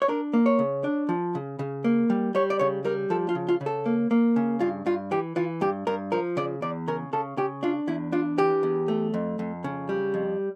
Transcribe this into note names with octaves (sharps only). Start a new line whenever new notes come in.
C#5
D4 A#4
A#3
C#5
C#3
D4
F3
C#3
C#3
A#3
G3
G3 C#5
D5
C#3 C#5
G3 A#4
F3 A4
F4
C#3
F4
C#3
A4
A#3
A#3
C#3
G2 F4
G2 F4
E3 G4
E3 F4
G2 G4
G2 A#4
F3 A#4
C#3 D5
E2 D5
C#3 A#4
C#3 A4
C#3 G4
D4 F4
E2 E4
D4 F4
E3 G4
E2
A3
F2
F2
C#3
G3
F2